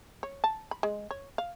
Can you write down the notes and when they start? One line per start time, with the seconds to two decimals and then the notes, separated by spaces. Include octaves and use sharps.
0.23 C#5
0.44 A5
0.71 B5
0.83 G#3
1.11 C#5
1.38 F5